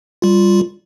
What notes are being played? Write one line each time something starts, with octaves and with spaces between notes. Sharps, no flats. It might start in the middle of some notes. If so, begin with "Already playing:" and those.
G3 F4